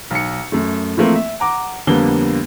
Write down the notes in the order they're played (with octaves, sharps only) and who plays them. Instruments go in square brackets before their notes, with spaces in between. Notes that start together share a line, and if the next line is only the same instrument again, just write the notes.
[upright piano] B1 C#7
F#2 A3
E3 F3 A3 A#3 C4
E5
F#5 A#5 D6
F2 D3 G3 A#3 B3 G7